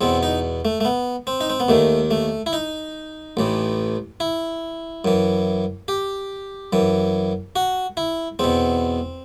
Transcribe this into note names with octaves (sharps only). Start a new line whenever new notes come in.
E2 B2 C4
D#4
A3
A3
B3
C4
D#4
C4
B3
D#2 D#3 A3
A3
E4
D#4
A1 A2 E3
E4
F#2 E3
G4
F#2 E3
F#4
E4
E2 B2 C4